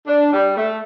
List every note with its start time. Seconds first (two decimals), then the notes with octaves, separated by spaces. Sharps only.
0.07 D4
0.33 G3
0.57 A3